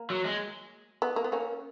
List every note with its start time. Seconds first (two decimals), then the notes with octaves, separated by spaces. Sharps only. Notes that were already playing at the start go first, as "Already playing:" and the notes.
Already playing: A#3
0.10 F#3
0.25 G#3
1.02 B3
1.16 A#3
1.24 B3
1.32 A#3 C#4